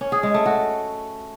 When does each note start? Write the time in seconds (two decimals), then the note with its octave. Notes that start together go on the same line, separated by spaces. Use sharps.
0.01 C#4
0.12 G#4
0.23 G#3
0.34 A3
0.46 F#4